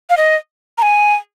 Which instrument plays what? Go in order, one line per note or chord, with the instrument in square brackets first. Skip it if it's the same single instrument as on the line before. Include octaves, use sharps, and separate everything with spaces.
[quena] F5
D#5
A#5
G#5